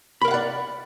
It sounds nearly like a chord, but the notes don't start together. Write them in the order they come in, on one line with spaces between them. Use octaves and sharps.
B5 A#4 F5 F#5 D5